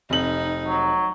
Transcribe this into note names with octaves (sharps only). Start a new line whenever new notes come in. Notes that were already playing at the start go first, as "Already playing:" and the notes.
F1 D#4 F#7
F#3